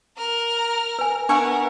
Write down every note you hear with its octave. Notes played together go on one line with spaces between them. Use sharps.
A#4 F6
B4 G#5
B3 D4 A#4 B4 E5 F#5 G#5 C#6